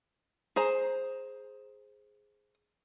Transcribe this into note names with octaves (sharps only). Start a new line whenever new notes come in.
G#4 C5 A#5